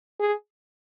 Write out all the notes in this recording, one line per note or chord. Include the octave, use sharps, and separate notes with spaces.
G#4